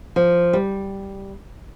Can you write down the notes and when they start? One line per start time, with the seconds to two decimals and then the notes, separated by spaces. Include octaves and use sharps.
0.16 F3
0.53 G3